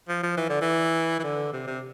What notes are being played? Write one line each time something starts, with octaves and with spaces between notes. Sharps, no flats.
F3
F3
E3
D3
E3
E3
D3
C3
C3